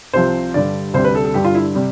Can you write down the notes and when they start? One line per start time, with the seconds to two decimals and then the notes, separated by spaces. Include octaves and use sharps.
0.13 C2 C3 F3 C5
0.54 G2 D3 G3 D5
0.94 D2 C3 G3 C5
1.05 B4
1.15 A4
1.25 A4
1.34 G2 D3 G3 G4
1.45 F4
1.55 E4
1.75 C3 G3